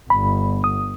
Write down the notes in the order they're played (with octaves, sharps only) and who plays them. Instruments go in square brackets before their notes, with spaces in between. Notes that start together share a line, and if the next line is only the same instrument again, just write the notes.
[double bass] G1 [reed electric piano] B5
[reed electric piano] D#6